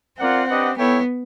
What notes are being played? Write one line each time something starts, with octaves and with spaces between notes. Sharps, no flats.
C4 F4 A#4 D5 F#5
D4 G4 B4 D#5 F#5
B3 E4 A4 C#5 E5 G5